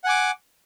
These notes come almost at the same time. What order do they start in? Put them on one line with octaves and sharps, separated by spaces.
F#5 G#5 D6